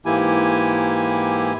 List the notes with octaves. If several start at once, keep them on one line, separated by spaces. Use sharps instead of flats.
G#2 E3 A#3 E4 G4 G#5